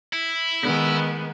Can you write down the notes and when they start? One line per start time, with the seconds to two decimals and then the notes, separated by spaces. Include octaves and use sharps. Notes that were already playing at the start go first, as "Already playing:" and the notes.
0.13 E4
0.63 D#3 G#3 B3